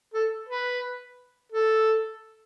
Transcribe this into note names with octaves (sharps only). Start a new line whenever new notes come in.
A4
B4
A4